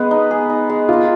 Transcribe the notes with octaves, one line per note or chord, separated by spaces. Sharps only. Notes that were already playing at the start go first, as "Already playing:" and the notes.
Already playing: G#3 B3 B4
D#4
G#4
D#4
G#3
A#3 F4